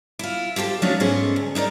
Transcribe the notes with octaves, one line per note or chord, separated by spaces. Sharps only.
E4 F4
F4 G4 A4 C5
F3 F#3 A3 C#4 D4 F4
G#2 A3 B3 C#4 G#4 C5
D2
D#4 E4 A#4 D5